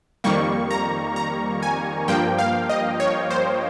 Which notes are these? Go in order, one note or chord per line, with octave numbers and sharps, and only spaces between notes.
F2 D#3 G3 A#3 C#6
A#5
A#5
G#5
G2 F3 A#3 G5
F5
D#5
C#5
C5